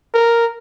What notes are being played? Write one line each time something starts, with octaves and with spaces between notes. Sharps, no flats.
A#4